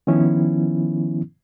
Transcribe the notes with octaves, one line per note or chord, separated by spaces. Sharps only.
D#3 F3 B3 C#4 E4